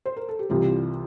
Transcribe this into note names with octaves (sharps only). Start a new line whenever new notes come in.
C5
A#4
A4
G4
C2 C3 E3 G3 F4